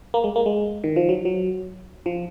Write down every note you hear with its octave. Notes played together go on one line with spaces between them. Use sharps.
A#3
G#3
A#3
G#3
D#3
F3
F#3
F#3
F3